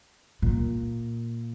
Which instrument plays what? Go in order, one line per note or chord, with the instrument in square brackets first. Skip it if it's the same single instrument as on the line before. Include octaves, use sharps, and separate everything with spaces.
[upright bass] A#2